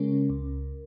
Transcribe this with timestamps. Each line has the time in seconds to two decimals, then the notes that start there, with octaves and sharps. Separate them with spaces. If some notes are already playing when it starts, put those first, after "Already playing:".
Already playing: C#3 G#3 C#4 A#4
0.29 C#2